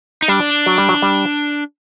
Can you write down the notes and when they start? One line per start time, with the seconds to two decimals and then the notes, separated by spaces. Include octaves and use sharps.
0.22 D#4
0.28 G3 D4
0.66 F#3
0.78 G3
0.89 F#3
1.02 G3